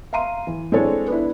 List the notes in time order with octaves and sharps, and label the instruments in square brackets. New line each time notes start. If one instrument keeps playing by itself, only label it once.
[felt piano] E5 F5 A#5 C6 D#7
E3
G#3 C4 D4 E4 A4 C#5
B3 D4 E4